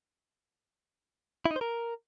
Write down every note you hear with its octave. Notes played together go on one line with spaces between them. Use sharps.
E4
D#4
C5
A#4